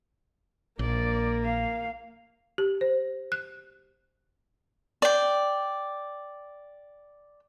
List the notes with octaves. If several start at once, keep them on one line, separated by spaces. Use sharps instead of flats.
A#1 A#3 D5
F5
G4
C5
F#6
D5 G5